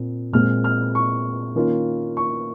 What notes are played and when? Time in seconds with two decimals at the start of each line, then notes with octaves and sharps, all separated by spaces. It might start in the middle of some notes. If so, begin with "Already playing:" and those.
Already playing: A#2 C4
0.33 A#2 G#3 C4 F6
0.64 F6
0.95 C#6
1.55 D#3 A#3 C#4 F4
2.17 C#6